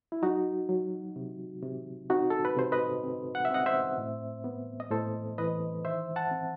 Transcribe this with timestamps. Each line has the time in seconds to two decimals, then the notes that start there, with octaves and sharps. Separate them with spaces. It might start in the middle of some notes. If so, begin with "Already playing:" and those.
0.12 E4
0.22 F#3 D#4 F#4
0.69 F#3
1.16 C3
1.62 C3
2.10 C4 D#4 F#4
2.30 A4
2.45 B4
2.57 C3 C5
2.72 B4 D#5
3.04 C4
3.35 F#5
3.45 E5
3.51 C4 D#5 F#5
3.66 C5 E5
3.98 A2
4.44 B3
4.80 D#5
4.91 A2 A4 C5
5.38 E3 B4 D#5
5.85 D#3 C5 E5
6.16 F#5 A5
6.31 C4